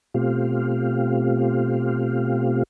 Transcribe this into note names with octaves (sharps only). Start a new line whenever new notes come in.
B2 A3 C4 F4 G4 F5